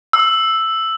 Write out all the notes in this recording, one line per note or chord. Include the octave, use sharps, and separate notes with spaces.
E6